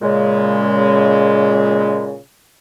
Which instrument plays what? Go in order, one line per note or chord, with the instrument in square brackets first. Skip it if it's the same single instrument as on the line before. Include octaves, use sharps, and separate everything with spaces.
[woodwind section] A#2 C#3 G#3